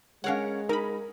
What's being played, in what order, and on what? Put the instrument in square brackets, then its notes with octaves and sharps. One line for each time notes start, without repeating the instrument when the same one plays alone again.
[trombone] G#3 [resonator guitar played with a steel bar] C#4 A#4 C#5 [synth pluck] F5 F#5
[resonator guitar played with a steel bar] D#4 [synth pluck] A#4 B5